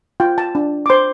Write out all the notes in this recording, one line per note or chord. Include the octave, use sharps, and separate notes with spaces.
F4 G5
A5
D4
D6
C5 C6